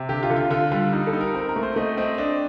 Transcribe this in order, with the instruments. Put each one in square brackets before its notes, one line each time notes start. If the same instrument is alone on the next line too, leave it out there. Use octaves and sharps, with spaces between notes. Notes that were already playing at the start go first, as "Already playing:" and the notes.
Already playing: [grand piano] C3
D3 G4
F4
D3
F4
D3 F4
G3 F4
D#4
A4
D#4
A#4
C4 A#4
A#4
A3
C5
A3 D#5
C4 D#5
D4 D#5